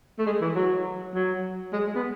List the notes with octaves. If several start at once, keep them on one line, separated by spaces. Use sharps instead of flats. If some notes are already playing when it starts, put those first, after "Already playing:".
A3
G#3
E3
F#3
F#3
G#3
G#3
B3